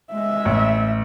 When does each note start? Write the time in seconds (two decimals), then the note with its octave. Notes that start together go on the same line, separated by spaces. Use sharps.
0.13 G#3 E5
0.45 A1